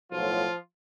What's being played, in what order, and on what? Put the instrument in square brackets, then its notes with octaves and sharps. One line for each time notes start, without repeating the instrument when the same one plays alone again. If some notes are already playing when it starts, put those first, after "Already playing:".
[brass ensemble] B1 A2 F3 F#3 F4